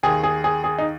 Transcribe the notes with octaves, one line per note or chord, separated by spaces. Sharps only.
D#2 D#3 G#4
G#4
G#4
G#4
D#4